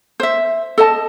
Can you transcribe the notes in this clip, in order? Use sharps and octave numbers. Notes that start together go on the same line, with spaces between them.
C5 E5
A4 D#5 A5